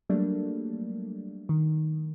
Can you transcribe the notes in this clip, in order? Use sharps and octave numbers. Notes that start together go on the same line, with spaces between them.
F#3 G3 A3 A#3 D4
D#3